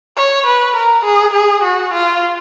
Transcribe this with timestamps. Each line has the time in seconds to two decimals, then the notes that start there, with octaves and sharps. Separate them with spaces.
0.17 C#5
0.47 B4
0.76 A#4
1.05 G#4
1.34 G#4
1.63 F#4
1.93 F4